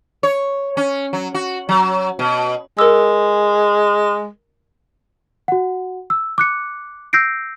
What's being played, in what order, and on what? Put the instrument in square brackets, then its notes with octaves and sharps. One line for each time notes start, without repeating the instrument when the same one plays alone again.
[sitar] C#5
C#4
F#3
F#4
F#3
B2
[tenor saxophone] G#3 [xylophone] A#4 E6
[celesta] F#4 F#5
E6
D6 F#6 C#7
E6 G6 A#6 C7 D7